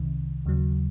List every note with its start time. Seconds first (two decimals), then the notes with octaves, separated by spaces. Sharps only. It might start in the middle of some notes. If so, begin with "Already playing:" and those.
Already playing: C2 C3 D#3
0.45 D#2 C#3 F#3